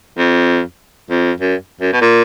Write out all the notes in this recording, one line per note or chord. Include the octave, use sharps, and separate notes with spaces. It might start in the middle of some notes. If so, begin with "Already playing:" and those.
F2
F2
F#2
F#2
B2
A#2